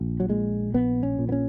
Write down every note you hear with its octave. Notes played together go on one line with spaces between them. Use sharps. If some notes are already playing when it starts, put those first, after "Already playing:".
Already playing: A#1
F#3
A#2 G#3
A#1 B3
C#4
A#2
B3
C#4